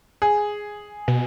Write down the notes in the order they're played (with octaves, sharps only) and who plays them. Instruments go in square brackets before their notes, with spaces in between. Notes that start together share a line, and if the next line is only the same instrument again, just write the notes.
[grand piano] G#4
[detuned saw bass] B2